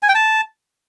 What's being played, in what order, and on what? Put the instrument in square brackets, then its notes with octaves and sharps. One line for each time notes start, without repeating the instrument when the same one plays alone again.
[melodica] G#5
G5
A5